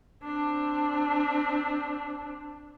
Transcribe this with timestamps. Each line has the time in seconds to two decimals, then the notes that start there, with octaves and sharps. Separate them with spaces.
0.24 C4 D4